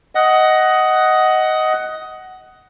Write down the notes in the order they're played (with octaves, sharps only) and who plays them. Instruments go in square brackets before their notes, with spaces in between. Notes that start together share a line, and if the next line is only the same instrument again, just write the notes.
[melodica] D#5 F#5